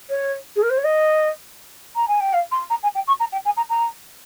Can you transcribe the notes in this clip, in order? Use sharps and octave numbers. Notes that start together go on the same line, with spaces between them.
C#5
G#4
A#4
C5
C#5
D#5
A#5
G#5
G5
F5
C6
A#5
G#5
G5
C#6
A#5
G5
G#5
A#5
A#5